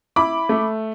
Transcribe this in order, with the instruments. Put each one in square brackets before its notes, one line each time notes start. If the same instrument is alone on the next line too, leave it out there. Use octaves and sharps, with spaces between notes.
[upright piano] E4 B5 D6
A3